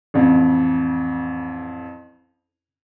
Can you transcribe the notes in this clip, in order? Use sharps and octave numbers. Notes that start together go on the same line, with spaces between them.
A1 F2